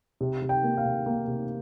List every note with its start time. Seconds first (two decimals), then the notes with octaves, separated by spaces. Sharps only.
0.21 C3
0.42 C3
0.49 G5
0.63 A#3
0.77 F5
0.85 C3
1.06 A#3
1.27 C3